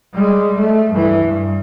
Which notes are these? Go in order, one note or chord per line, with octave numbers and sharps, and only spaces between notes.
G3 G#3
A3
G2 E3
G2